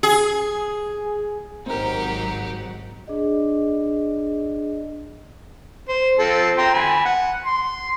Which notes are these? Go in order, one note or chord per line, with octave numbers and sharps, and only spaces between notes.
G#4
G#1 F#3 C4 D#4 G4 A#4 F#5
D4 G#4 D5 D#5
C5
F3 C4 A4
G5 A#5 C6
G#5 B5
F#5
C6